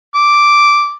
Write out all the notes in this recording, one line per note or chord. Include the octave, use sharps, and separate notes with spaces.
D6